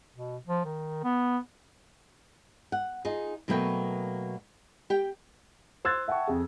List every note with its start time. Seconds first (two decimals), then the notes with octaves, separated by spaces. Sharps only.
0.14 B2
0.47 F3
0.65 D#3
1.04 B3
2.72 F#5
3.05 D#4 F4 G#4
3.48 B2 F#3 A3 A#3 B4 G5
4.90 G4 G5
5.85 C5 C6 E6 F#6 G#6 A6
6.08 E5 F#5 G5 A5 C#6
6.28 F2 G#4